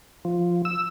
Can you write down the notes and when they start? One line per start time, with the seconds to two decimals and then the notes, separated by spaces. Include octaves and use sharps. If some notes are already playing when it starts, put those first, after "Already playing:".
0.25 F3
0.65 E6